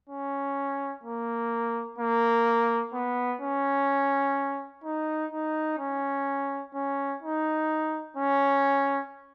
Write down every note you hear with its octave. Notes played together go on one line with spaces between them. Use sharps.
C#4
A#3
A#3
B3
C#4
D#4
D#4
C#4
C#4
D#4
C#4